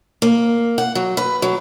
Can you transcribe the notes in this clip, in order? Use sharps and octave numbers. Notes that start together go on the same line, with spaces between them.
A#3
F#5
F#3
B4
F#3